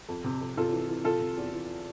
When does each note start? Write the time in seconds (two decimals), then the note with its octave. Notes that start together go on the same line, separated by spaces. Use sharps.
0.09 F2
0.24 C3
0.41 F2
0.57 C3 F4 A4
0.73 E3
0.88 E3
1.04 C3 F4 A4
1.20 C3
1.37 E2
1.53 E3